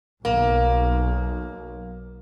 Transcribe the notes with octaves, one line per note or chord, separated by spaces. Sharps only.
B1 A#3